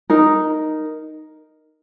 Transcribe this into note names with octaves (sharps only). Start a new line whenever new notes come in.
D#4 A#4